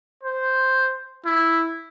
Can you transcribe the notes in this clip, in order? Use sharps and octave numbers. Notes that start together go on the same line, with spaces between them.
C5
E4